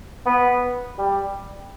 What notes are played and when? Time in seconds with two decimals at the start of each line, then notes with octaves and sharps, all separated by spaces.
0.26 B3
0.99 G3